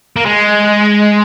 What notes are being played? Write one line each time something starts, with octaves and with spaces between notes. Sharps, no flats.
A#3
G#3